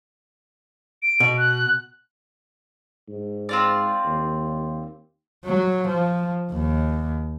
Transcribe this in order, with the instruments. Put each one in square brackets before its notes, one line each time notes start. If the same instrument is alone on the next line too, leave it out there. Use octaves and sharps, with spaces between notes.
[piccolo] D7
[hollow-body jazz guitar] B2
[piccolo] F#6
[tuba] G#2
[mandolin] C4 F4 D5
[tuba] D#2
[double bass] F#3
F3
D#2